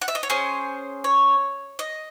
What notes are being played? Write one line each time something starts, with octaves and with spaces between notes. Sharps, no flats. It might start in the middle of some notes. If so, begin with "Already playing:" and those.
F#5
E5
D#5
C#5
C#4 G#4 C5
C#5
D#5